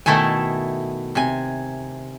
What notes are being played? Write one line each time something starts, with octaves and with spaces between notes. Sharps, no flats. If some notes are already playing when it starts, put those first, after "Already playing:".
B2 D#3 A3 E4 A4 G#5
C3 G#5